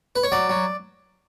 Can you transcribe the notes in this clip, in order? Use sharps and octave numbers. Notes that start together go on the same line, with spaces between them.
B4
C#5
F#3 D5
F#3